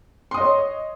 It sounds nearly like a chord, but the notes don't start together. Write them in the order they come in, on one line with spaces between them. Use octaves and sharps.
C6 D#6 D#5 C#5